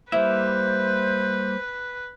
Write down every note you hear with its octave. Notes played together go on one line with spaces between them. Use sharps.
G3 A#3 E4 B4 C5 E5